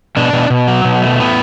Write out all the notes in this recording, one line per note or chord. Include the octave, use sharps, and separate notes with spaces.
B2 D4
B2
B2
F#3
B2
A3
A2 B3